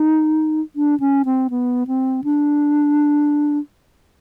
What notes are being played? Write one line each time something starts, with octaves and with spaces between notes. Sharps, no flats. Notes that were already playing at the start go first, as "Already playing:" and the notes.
Already playing: D#4
D4
C#4
C4
B3
C4
D4